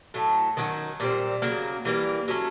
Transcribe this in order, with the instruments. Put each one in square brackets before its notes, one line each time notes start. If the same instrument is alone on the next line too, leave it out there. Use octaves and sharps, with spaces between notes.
[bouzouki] A2 F#3 A3
D#3 F#3 A3 C#4
A#2 G3 C4
C#3 F#3 A#3
E3 G3 A#3
F#3 A3 C#4